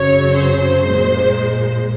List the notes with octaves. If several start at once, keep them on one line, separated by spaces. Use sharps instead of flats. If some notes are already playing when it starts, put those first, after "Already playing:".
Already playing: F#2 C#3 F#3 C#5
C5
A#2 G#3